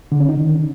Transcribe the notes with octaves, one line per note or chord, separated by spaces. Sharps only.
D3
C#4
D#4
D#3